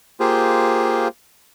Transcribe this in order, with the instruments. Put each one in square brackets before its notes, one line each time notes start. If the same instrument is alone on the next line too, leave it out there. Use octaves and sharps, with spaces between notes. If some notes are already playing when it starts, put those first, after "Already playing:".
[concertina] A#3 F4 G4 G#4 C5